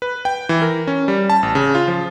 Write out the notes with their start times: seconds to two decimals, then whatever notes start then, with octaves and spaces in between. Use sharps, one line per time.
0.02 B4
0.25 G5
0.49 E3
0.62 A#4
0.87 C#4
1.08 G3
1.30 A5
1.43 A1
1.55 C#3
1.75 F4
1.88 F3